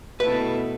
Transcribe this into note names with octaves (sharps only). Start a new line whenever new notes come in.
B2 A3 E4 A4 B4